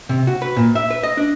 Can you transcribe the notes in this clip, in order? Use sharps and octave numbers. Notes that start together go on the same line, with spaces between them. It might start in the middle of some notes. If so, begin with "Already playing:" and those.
C3
F#4
B4
A#2
E5
B4
D#5
D4